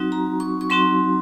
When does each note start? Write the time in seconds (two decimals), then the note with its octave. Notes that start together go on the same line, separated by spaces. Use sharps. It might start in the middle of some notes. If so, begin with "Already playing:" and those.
Already playing: F#3 C4 D#4 F#4
0.12 A#5
0.40 C#6
0.61 C#6
0.70 F#3 C4 D#4 F#4 C6